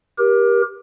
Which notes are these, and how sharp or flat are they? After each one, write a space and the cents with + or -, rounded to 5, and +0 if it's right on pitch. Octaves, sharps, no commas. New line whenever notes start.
G4 +5 A#4 +30